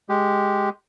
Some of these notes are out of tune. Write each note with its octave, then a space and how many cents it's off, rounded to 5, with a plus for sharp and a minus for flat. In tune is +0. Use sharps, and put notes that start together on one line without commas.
G#3 +0 G4 +0